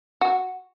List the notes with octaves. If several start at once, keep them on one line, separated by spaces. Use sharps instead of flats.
F#4